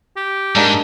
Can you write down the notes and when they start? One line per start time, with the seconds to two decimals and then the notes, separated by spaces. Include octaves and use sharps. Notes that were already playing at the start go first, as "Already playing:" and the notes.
0.17 G4
0.55 G#2 G#3 A#3 D4